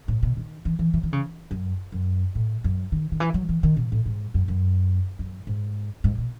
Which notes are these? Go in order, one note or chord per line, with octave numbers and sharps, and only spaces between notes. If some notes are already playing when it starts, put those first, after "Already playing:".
A2
B2
D#3
E3
E3
E3
D#3
C#3
F#2
F#2
A2
F#2
D#3
D#3
E3
F#3
E3
D#3
B2
A2
G#2
F#2
F#2
F#2
G#2
G#2
B2